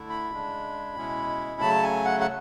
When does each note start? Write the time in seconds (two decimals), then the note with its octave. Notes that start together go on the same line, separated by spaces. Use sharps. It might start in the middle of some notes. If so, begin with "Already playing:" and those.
Already playing: D3 A3 E4
0.09 B5
0.30 C#3 G#3 D4
0.96 B2 G#3 C#4 E4
1.61 C#3 F#3 A3 A5
1.83 G#5
2.05 F#5
2.20 F#5